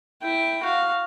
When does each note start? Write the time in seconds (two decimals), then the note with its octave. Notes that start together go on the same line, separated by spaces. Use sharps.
0.23 E4 G5
0.63 F#4 F5